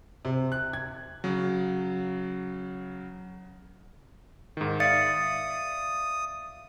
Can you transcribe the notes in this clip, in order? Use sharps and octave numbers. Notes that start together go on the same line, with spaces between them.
C3
F#6
G#6
C#3 F#3
G#2 D#3
D5 E5 F5 D#6 A6 C#7